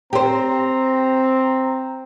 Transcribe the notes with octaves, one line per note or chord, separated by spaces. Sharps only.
C4 G4 C5 A#5